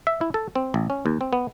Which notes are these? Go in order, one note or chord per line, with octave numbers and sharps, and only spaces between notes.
E5
E4
A4
C4
A1
C#4
D#2
C4
B3